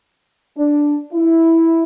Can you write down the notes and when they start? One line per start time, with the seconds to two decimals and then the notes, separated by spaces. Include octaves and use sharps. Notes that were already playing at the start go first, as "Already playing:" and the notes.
0.58 D4
1.13 E4